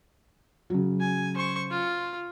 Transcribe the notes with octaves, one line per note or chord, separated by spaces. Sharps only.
C#3 F#3
G#5
C5 C#6
F4